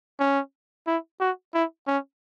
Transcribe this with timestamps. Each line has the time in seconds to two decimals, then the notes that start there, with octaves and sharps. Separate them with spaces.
0.20 C#4
0.87 E4
1.21 F#4
1.54 E4
1.87 C#4